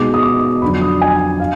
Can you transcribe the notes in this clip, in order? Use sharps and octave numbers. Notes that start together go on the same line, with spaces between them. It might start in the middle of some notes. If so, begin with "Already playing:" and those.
Already playing: B2 G#3 D#4 D6
D#6
D6
F2 D3 F#3 D4 B5
D#6
G#5
F5